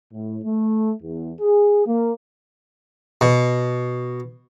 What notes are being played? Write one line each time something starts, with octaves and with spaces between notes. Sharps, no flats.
A2
A3
E2
G#4
A#3
B2